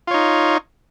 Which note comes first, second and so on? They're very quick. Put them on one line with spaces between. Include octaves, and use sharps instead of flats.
F4 C#5 D#4